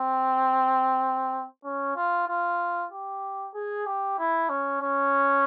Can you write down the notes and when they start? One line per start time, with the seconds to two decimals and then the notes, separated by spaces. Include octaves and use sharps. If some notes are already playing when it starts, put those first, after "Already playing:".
Already playing: C4
1.65 C#4
1.97 F4
2.28 F4
2.92 G4
3.55 G#4
3.86 G4
4.19 E4
4.50 C#4
4.81 C#4